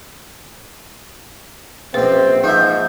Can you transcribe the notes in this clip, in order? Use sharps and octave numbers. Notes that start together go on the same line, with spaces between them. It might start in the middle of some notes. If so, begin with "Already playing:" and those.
A#1 F#2 C4 B4
G#2 F3 D#4 E5 G6